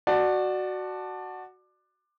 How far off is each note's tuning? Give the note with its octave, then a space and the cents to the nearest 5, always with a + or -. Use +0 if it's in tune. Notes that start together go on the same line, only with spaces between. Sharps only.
F#4 +0 D5 +20 A5 +0